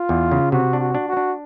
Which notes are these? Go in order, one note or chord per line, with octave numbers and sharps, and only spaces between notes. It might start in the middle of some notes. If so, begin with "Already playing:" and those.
Already playing: F4
E2
C#3
C3 F#4
D4
F#4
D4
F#4
D4